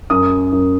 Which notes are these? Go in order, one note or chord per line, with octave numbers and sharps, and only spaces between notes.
F#2 D#6
F#2